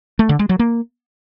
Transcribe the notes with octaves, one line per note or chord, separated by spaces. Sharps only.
A3
D3
G#3
F#3
A#3